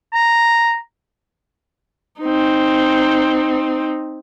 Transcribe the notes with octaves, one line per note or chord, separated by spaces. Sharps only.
A#5
C4 D#4